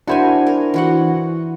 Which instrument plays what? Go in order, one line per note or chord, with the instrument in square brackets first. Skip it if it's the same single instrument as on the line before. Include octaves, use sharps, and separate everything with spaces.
[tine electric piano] D4 E4 C5 [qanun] F#4 A#4 G#5
[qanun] A#4
E3 F#4 F#5